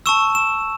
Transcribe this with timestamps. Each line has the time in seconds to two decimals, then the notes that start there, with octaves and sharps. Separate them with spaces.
0.06 A5 C#6 E6 E7
0.35 E7